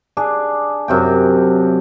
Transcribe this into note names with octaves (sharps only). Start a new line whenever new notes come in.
D4 G#4
F#2 C3 G5